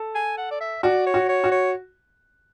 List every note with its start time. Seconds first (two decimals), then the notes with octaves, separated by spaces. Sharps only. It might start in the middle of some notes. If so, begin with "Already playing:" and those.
Already playing: A4
0.15 G#5
0.38 F#5
0.51 D5
0.60 E5
0.83 F#4 D5
1.07 C#5
1.14 F#4
1.29 C#5
1.44 F#4
1.52 C#5